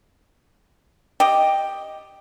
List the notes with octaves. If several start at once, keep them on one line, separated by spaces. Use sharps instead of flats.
G4 D#5